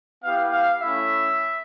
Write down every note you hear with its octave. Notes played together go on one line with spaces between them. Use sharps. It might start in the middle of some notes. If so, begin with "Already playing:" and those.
B3 E4 G4 F5
F5
A3 C#4 E4 E5